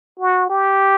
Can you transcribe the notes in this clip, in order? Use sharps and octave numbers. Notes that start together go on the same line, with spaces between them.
F#4
G4